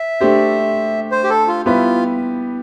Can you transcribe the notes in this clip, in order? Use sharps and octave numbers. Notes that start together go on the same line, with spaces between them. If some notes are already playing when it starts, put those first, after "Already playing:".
Already playing: E5
A3 D4 G4 C5
C5
G4
A4
F4
G3 B3 E4 F4 G4 B4